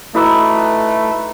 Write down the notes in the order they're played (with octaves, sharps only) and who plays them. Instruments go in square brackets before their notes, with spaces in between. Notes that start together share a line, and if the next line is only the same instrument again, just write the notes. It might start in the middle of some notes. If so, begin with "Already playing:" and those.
[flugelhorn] A3 [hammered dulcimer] D#4 B4 D6 [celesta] E4 F#4 E6